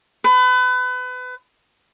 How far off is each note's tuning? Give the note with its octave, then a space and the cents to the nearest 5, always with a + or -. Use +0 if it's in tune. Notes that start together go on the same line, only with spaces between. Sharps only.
B4 +30